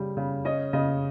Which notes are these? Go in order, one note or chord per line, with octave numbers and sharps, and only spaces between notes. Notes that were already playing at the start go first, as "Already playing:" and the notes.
Already playing: C#3 G3
C#3
C#4 D#5
C#3 D#5